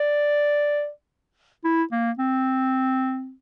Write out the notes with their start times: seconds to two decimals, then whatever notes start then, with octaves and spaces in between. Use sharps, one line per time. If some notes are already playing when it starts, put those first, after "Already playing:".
Already playing: D5
1.64 E4
1.92 A#3
2.18 C4